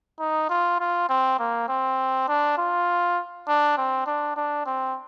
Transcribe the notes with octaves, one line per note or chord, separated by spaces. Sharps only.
D#4
F4
F4
C4
A#3
C4
D4
F4
D4
C4
D4
D4
C4